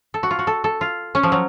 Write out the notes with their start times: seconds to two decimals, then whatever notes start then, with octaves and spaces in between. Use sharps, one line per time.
0.14 A4
0.23 F#4
0.31 F4
0.39 F#4
0.47 A4
0.64 A4
0.81 F4
1.15 C#4
1.23 F3
1.32 F#3